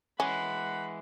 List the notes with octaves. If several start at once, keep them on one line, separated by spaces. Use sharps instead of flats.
E3 G#3 C#4 F#5 B5